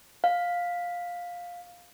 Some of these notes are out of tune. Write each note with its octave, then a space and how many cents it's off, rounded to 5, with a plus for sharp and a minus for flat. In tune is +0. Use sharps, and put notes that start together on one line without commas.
F5 +10